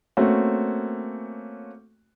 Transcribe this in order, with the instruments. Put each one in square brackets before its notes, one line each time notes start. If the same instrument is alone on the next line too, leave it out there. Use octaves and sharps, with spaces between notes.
[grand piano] A3 A#3 C4 C#4 F#4